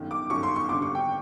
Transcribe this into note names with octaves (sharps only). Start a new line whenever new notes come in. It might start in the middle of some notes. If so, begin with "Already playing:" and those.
Already playing: G1 F#2 D#3
D6
G1 F#2 D#3 C#6
C6
C#6
G#1 G2 D3 D6
C#6
G5